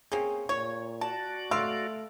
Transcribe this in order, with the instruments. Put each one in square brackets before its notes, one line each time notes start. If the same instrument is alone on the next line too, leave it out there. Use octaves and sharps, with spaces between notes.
[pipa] A#3 C4 C#4 [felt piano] G#4
[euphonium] A#2 [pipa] C#5 [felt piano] C#6
[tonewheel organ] F#4 D5 [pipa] A5
[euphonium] A3 [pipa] F5 [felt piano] C6 E6 D7